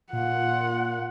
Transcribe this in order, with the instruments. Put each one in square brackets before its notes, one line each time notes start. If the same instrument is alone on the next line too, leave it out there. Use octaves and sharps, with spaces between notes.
[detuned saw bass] A#2 [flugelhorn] F4 [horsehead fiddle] F#5